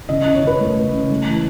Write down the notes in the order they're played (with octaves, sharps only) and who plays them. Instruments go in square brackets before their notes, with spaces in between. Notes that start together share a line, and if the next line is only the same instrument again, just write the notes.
[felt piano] C#3 D#5
C#3 D#5
C#5
C#3 B4
A3
C#3
C#3
A3
E3